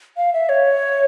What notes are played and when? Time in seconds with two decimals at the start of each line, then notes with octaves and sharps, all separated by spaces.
0.17 F5
0.33 E5
0.49 C#5